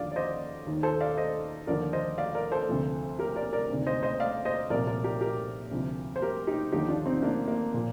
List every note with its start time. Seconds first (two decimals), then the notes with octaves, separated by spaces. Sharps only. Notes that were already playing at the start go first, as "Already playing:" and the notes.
Already playing: D#2 D3 F3 D5 F5
0.12 D5
0.16 C5 D#5
0.66 D#2 D#3
0.83 A4 C5
1.00 D5 F5
1.17 C5 D#5
1.67 D#2 D3 F3 A#4 D5
1.93 C5 D#5
2.18 D5 F5
2.35 A#4 D5
2.52 A4 C5
2.69 D2 C3 F3
3.19 G4 A#4
3.36 A#4 D5
3.53 A#4 D5
3.70 D2 C3 D#3
3.87 C5 D#5
4.03 C5 D#5
4.20 D5 F5
4.45 C5 D#5
4.70 C2 A#2 F3 A#4 D5
4.87 A#4 D5
5.04 G4 A#4
5.21 G4 A#4
5.71 D2 C3 F3
6.16 C5
6.22 G4 A#4
6.47 D#4 G4
6.72 D#2 D3 F3 D#4 G4
6.88 D4 F4
7.06 C4 D#4
7.22 A#3 D4
7.48 A#3
7.74 A#2 F3